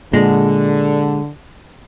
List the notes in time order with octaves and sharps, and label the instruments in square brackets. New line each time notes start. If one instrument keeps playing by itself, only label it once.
[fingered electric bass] A#2 [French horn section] D3 [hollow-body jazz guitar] G#3